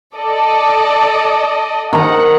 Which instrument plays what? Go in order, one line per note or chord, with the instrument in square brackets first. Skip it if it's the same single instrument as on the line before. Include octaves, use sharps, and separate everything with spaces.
[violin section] A4 D5 D#5
[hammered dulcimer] D#3 A#5 [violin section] F#5